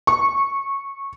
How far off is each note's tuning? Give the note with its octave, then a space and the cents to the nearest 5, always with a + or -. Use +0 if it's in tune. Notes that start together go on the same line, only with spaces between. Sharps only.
C#6 -15